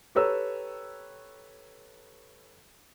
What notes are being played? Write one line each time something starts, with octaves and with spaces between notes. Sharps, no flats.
G4 A4 B4 C#5 A#5 E6